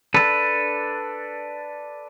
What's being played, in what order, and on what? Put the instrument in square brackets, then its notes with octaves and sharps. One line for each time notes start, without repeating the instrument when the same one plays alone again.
[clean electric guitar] D4 A4 B4